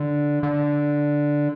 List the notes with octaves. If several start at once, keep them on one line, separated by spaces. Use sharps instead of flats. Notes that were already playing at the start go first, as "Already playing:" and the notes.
Already playing: D3
D3